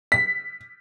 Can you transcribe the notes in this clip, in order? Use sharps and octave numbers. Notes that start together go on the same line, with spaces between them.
B6